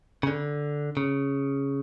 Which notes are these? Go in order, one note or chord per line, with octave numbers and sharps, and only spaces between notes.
C#3
D3
C#3